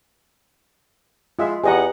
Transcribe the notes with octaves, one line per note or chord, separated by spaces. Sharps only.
G#3 F4 E5
E2 G4 D#5 F#5 G#5 A#5